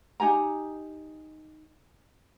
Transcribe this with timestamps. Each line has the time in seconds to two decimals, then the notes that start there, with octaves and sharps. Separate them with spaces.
0.20 D#4 G4 G#5 A#5